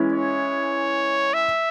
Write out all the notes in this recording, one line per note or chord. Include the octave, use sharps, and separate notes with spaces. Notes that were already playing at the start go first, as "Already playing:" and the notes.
Already playing: E3 G#3 C#4 E4
C#5
E5